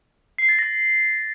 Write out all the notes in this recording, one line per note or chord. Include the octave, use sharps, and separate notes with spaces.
C7
A6
A#6